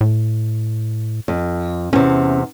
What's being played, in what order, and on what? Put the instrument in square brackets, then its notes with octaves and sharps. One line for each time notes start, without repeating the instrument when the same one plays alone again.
[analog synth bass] A2
[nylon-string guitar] F2
[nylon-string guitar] E2 C3 [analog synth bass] C#4